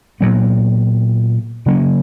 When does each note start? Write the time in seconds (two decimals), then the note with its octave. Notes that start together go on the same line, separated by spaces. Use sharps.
0.21 A#2 F#3 B3
1.66 C#3 F#3 A#3 C#4